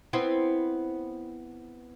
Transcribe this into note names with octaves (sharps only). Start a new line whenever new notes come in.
B3 C4 E4